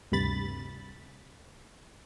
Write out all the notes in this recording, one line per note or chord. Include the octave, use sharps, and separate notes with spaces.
D2 G2 C3 B5 A6